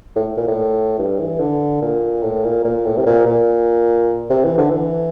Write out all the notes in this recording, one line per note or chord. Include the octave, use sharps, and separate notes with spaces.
A2
A#2
A2
G2
E3
D3
A#2
A2
A#2
A#2
A2
C3
A#2
A#2
C3
E3
D3
E3